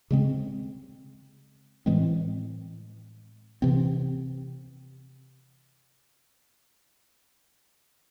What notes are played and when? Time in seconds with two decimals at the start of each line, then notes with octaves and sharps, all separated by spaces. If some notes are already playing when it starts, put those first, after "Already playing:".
0.11 C#3 G#3 C4
1.86 A2 E3 G#3 C4
3.62 C3 E3 C4